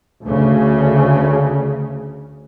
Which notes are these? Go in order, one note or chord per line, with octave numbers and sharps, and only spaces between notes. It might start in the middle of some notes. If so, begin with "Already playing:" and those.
D2 C#3